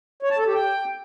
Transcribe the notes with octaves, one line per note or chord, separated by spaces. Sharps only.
C#5
A5
A4
G4
G5